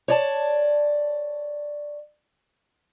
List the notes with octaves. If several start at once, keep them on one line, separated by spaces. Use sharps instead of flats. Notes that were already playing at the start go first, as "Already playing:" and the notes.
C#5 D5 A5